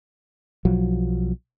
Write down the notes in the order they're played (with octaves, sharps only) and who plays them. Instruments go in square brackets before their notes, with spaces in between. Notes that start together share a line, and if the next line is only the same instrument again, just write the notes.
[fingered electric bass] B1 F3 F#3